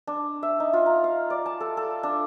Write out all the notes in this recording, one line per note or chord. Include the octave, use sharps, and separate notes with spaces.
D4
E5
D#4
F4
A#5
F5
D5
A5
A4
A4
D4